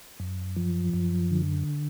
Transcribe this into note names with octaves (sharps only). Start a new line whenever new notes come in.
F#2
F3
F#2
D3